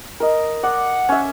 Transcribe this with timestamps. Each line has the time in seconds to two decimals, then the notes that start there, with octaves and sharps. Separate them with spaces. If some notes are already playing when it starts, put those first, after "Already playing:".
0.20 A#4 D#5
0.63 D5 F#5
1.09 C#4 E5